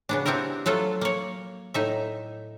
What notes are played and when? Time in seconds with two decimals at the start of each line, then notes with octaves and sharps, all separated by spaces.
0.09 C#3 B3 D4
0.26 B3 C4 E4 G4 A#4
0.66 F#3 A3 F4 A4
1.01 A#3 C#5
1.74 A2 D#4 E5